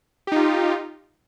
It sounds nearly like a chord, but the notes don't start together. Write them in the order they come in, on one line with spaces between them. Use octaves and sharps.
G4 D#4 F4